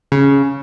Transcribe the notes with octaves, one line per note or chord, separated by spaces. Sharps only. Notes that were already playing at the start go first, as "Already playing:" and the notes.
C#3